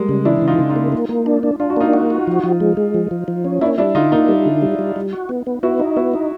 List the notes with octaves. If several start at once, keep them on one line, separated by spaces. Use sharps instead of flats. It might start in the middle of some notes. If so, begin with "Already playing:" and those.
Already playing: G3 G#3 A#3
C#3
E3 D4 E4
C#3
D#4 F4
C#3
D#4 F4
A#3
A#3
A#3
D4
D4
D4 F4
F#4
A#3 D#4 F4
F#4
F#4
F3
F3
G#3
G#3
F3
F3
F3
C#4
A#3 D4 E4
G3 D4 E4
D3 D#4 F4
A#3 D#4 F4
G3
D3
G3
G3
G3
F#4
B3
B3
B3 E4 F#4
D#4
B3 E4 F#4
D#4